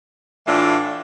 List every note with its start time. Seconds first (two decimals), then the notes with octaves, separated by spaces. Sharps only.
0.47 A2 E3 A3 D4 F4